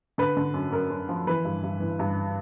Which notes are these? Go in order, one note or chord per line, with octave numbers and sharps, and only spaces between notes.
D3 B4
D3
F#2
F#2 A#4
F#2
F3
E3 B4
G2
G2
E3
G2